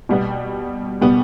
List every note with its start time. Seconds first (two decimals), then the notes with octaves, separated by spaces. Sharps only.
0.09 B2 G3 B3
1.01 B2 G3 B3